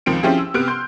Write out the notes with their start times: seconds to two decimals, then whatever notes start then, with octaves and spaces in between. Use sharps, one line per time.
0.06 C#2 D#3 F3 C4 D7
0.23 F3 C4 C#4 E4 G4 G#4
0.38 E6
0.54 C3 B3 F6 F#6 D7
0.68 C6 G6